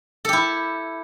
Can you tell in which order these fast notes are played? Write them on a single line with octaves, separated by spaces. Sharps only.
A4 G4 E4